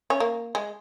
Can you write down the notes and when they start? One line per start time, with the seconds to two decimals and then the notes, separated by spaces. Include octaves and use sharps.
0.10 C#4
0.20 A#3
0.55 G#3